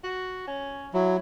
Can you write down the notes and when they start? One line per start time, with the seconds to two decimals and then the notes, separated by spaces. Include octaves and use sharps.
0.04 F#4
0.47 C#4
0.94 F#3 E4